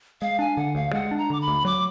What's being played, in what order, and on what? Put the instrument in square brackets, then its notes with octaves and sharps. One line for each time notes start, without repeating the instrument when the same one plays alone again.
[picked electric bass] G#3 [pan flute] F5
[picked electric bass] D4 [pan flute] G#5
[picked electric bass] D3 [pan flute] F#5
[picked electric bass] D2 [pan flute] F5
[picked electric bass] G#3 [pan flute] F#5
[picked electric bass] D4
[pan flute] A#5
[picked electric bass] D3 [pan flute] D6
[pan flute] B5
[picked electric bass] D2
[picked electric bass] F#3 [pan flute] D6